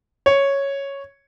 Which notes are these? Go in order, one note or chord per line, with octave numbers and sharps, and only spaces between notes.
C#5